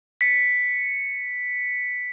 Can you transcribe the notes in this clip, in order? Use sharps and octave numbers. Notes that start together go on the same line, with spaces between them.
B6 C#7